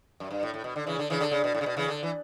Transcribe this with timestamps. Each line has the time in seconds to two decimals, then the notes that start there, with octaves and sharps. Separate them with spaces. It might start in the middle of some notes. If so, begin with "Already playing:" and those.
0.20 F#2
0.31 G2
0.43 A2
0.54 A2
0.64 B2
0.76 D3
0.86 C#3 E3
0.99 D3
1.10 C#3 E3
1.21 D3
1.32 C#3
1.44 B2
1.55 A2
1.61 C#3
1.66 B2
1.77 C#3 E3
1.89 D3
2.03 E3